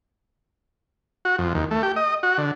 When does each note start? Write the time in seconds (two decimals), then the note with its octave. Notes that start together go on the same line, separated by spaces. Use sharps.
1.25 F#4
1.38 F2
1.55 D#2
1.71 A3
1.83 G4
1.96 D#5
2.23 F#4
2.38 D3